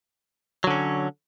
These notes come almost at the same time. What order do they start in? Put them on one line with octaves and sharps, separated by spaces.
F#3 D3 C#4